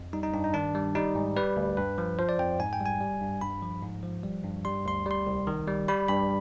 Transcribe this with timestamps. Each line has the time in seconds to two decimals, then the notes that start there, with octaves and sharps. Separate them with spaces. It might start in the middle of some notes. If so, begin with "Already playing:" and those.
Already playing: F2
0.13 G3 D#4
0.23 D#4
0.34 G2 D4
0.44 D#4
0.54 D#3 D4
0.75 G3
0.95 G3 D#4
1.15 G#2
1.36 G3 B4
1.57 D2
1.77 G2 B4
1.98 F3
2.19 F3 C5
2.29 D5
2.39 F2 G5
2.60 G#2 G#5
2.73 G5
2.80 G3
2.86 G#5
3.01 G3
3.21 G2
3.41 G2 B5
3.62 F3
3.83 G#2
4.03 F3
4.24 G3
4.44 G2
4.65 G3 C6
4.85 D2 C6
5.06 G3 C6
5.27 C2
5.47 D#3
5.67 G3
5.88 G3 B5
6.08 G2 B5